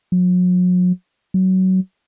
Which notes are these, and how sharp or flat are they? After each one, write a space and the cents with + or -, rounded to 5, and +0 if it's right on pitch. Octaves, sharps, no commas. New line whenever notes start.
F#3 -40
F#3 +20